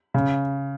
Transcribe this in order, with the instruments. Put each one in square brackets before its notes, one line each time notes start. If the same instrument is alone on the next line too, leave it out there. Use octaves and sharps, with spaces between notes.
[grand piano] C#3